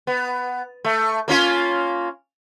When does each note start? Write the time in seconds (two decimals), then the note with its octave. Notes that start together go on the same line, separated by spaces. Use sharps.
0.07 B3
0.84 A3
1.28 A#3 C#4 F4